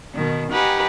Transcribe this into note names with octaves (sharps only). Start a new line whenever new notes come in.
B2 D#3
D#4 G4 B4 F#5 G#5 A#5